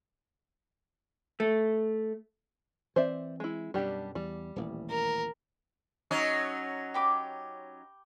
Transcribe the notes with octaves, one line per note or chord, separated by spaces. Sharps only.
A3
E3 C4 C5 D5 E5
G#3 E4
F#2 B2 G3 D4 G4
E2 G3
D#1 A1
A#4
F#3 C#4 D#4
G4 B5 D6